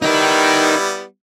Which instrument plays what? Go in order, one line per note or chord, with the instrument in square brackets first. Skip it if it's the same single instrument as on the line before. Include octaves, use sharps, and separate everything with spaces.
[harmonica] G3 B3 E4 [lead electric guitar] D#4 A#4